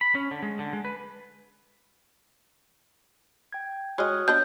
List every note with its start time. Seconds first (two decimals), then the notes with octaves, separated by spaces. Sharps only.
0.01 B5
0.15 C#4
0.31 D3
0.42 G#3
0.59 D3
0.73 G#3
0.85 B4
3.53 G5 G#6
3.98 G#3 F#4 C#5 D#5 D#6 F6 F#6
4.28 B3 D4 D#5 G6